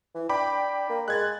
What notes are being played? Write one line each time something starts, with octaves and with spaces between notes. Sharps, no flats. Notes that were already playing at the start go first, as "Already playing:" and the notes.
E3
D4 G5 B5 D6
A#3
G#3 F#6 G#6 A6